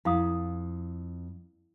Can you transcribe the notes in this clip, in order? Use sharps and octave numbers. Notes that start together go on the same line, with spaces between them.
F2 E4 F5 D#6